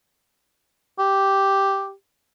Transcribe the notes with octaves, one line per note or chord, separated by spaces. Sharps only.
G4